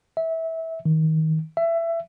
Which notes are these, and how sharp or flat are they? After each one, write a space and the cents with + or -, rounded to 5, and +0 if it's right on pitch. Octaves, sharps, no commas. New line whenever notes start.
E5 -20
D#3 +25
E5 +20